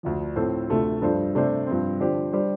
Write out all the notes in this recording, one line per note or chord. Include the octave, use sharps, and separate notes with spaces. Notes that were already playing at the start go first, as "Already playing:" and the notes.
D2 D3 F3
A2 F3 C4 A4 C5
D2 C3 A3 F4 A4
G2 F3 D4 A4 C5
C3 A3 D4 G4 C5
G2 F3 C4
D3 F3 D4 G4 C5
G3 D4 G4 C5